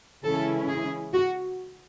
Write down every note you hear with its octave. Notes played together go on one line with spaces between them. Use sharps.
C#3 E3 G#3 C#4 E4 A4
G#4
F#4